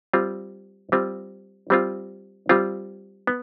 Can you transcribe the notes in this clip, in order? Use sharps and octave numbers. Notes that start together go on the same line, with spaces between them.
G3 C4 F4
G3 C4 F4
G3 C4 F4
G3 C4 F4
B3